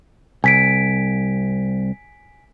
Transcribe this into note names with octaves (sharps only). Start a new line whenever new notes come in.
C2 G#5 B6 D7